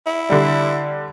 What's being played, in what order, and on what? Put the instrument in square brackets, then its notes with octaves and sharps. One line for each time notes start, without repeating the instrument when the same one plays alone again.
[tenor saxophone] E4
[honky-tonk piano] D3 G3